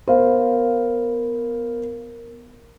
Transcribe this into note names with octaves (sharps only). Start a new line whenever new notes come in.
B3 A#4 C5 F5